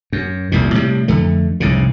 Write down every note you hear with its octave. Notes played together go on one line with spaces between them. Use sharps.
F#2
D#1 C2 F2 A#2
A2 C3 G3
F2 D3 A3
F1 C2 G#2 C#3